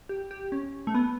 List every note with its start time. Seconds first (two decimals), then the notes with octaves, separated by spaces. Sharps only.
0.09 G4
0.31 G4
0.52 C#4
0.87 A3
0.95 B3